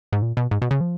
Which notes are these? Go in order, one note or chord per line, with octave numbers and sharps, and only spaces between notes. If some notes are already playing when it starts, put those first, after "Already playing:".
G#2
A#2
B2
G#2
B2
C#3
F3